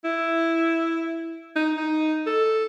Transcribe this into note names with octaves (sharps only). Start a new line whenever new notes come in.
E4
D#4
D#4
A4